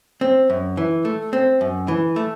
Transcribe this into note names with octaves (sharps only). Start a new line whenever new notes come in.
C4
F#2
E3
A3
C4
F#2
E3
A3